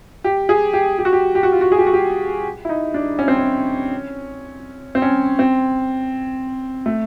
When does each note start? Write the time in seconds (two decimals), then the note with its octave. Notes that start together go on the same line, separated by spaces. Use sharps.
0.24 G4
0.49 G#4
0.73 G4
0.99 G4
1.05 F#4
1.13 G4
1.35 G4
1.43 F#4
1.52 F4
1.61 F#4
1.72 G#4
1.78 G4
1.87 F#4
1.93 G4
2.65 E4
2.69 D#4
2.94 D4
3.19 C#4
3.28 C4
3.37 C#4
4.95 C4
5.02 C#4
5.39 C4
6.86 A3